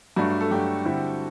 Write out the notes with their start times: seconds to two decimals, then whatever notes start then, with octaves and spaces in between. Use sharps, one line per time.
0.16 G2 F#3 A3 D4 F#4
0.41 A4
0.51 G2 F#3 A3 D4 G4
0.85 D3 G3 C4 E4